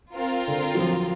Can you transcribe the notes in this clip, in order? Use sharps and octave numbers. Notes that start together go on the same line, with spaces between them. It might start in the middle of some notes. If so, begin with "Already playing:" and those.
C4 F4 A#4
D3
F#3
F3